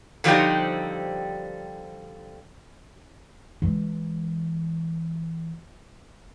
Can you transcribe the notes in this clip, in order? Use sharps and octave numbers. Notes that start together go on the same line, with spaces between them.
D3 F3 G3 C4 D#4 G4
E3 G#3